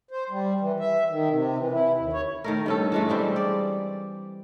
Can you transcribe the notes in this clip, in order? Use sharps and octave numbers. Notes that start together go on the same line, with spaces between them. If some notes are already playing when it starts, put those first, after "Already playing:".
C5
G3
E3
E5
D#3
C3
E3
E4
D#2
C#5
D#3 A3 A#4
G2 C#4 A4
E3 G#3 A3
G3 C4 G#4
D5